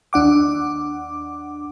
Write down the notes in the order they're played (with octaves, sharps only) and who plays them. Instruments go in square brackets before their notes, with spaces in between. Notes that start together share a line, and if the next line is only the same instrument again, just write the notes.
[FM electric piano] D#2 D4 F#5 D6